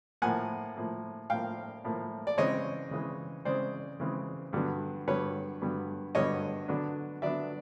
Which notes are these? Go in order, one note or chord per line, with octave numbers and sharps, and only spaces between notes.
A2 F3 A#3 F#5 G#5
A2 F3 A#3
A2 F3 A#3 F5 G5
A2 F3 A#3
D5
C#3 E3 G#3 C4 C#5 D#5
C#3 E3 G#3 C4
C#3 E3 G#3 C4 C5 D5
C#3 E3 G#3 C4
G2 D3 F#3 B3
G2 D3 F#3 B3 B4 C#5
G2 D3 F#3 B3
G2 D3 F#3 B3 C#5 D#5
D3 F#3 B3 D4
D3 F#3 B3 D4 D5 E5